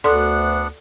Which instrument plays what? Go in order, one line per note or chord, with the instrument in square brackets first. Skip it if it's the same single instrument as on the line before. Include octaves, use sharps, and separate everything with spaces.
[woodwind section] D2 [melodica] B3 D4 F#5 [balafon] A4 D5 C6